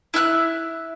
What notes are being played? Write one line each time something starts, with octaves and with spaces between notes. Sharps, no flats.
E4 E5 F6 F#6